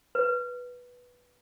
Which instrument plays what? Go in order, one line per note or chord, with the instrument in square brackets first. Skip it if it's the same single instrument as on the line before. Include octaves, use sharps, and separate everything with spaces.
[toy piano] B4